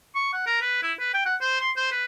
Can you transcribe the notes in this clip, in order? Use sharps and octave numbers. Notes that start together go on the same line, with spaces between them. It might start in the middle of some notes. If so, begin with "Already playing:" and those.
C#6
F#5
A#4
B4
E4
B4
G5
F#5
C5
C6
C5
B4